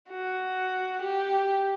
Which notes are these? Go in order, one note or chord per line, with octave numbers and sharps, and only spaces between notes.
F#4
G4